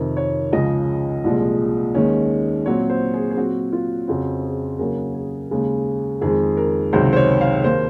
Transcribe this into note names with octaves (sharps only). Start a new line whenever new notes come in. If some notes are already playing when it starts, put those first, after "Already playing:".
Already playing: F2 C3 D#3 A#4
C#5
C#2 C#3 F3 D#5
C2 A#2 F3 G#3
D#2 D#3 G#3 C#4
A#2 F#3 C4 C#5
C5
G#4
G#4
A#2 F#3 C4 F#4
F4
F2 C#3 F3 C4 F#4
G#4
D#2 C#3 F#3 A#4
G#4
D#2 C#3 G#3
F2 D#3 G#3 G#4
A#4
C#2 C3 D#3 F#3 C4 C5
C5
C#5
F5
D#2 D#3 A#3 C5